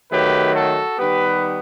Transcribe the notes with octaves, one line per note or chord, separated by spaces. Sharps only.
D#3 F#3 A3 G4 B4
F#4 A4
D#3 G3 B3 G4 B4